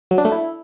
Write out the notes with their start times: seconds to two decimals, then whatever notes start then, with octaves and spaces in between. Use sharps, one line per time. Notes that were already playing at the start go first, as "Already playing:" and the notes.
0.11 F#3
0.18 D4
0.25 A3
0.32 E4